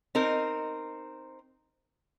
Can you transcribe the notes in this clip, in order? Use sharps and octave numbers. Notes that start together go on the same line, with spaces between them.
C4 D#4 A#4